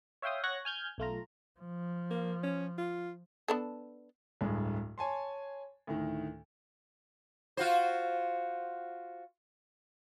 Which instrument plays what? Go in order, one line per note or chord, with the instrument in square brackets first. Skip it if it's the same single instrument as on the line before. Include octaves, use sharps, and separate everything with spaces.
[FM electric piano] C#5 E5 F5 G5 C6 D#6
C#5 F#5 C#6 F#6 A#6
G#5 F6 G6 G#6
B1 A3 F4 A#5
[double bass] F3
[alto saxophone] A#3
C#4
F4
[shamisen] B3 D4 A4
[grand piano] D1 G2 G#3
C#5 G#5 A5 C6
D2 A2 D#3
[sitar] F4 F#4 C5